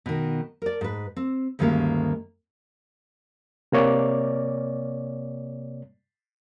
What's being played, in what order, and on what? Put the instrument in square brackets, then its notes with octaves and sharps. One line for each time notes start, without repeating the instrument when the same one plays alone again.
[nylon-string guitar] B2 D#3
A#4 D5
G#2 B4
C4
D2 G2 D#3 G#3 A#3 C#4
[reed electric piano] C3 A#3 C#5 D5